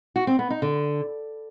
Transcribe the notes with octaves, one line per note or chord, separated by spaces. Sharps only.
F#4
C4
B3
D#4
D3